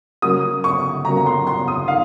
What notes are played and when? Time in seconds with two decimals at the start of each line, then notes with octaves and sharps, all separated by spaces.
0.22 C#3 F#3 A#3 D#6
0.64 C#6
1.05 C#3 F#3 A#3 A#5
1.17 A#5
1.26 C6
1.47 C6
1.68 D#6
1.88 D#3 F5